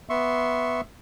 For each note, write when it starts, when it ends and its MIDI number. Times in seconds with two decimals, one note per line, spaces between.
0.10 0.81 59
0.10 0.81 76
0.10 0.81 84
0.10 0.81 85